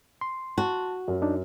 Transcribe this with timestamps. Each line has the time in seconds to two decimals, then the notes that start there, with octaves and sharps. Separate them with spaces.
0.21 C6
0.58 F#4 A5
1.08 F#2
1.22 D4 D#4